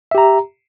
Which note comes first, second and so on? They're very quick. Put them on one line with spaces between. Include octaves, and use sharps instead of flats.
E5 G4 A#5